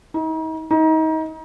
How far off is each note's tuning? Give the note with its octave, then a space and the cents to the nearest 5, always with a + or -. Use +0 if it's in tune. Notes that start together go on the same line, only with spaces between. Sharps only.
D#4 +40
D#4 +30